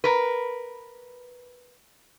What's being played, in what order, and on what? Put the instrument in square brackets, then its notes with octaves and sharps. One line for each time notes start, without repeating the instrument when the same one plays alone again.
[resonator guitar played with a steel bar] A#4 B4